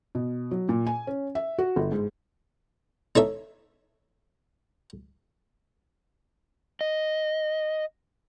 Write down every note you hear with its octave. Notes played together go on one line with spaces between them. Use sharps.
B2
F#3
A#2
G#5
C#4
E5
F#4
G1
G#2
D#4 A4 C#5 E5
D#5